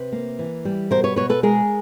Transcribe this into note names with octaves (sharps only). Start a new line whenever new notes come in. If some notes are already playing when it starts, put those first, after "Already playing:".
Already playing: C3 B4
A#3
E3
G3
B2 A#4 C5
B4 C#5
B2 B4 C#5
A4 B4
G#3 G#4 A#4